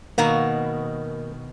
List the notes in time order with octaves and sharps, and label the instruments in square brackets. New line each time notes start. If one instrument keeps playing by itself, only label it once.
[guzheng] B2 D#3 F#4 [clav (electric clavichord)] A#3